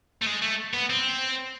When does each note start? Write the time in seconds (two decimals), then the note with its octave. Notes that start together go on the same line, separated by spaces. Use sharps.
0.22 A3
0.26 G#3
0.42 A3
0.74 B3
0.90 C4